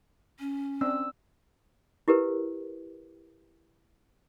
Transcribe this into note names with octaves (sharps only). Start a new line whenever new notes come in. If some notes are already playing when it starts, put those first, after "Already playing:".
C#4
C4 D4 E6
E4 G4 A#4 B4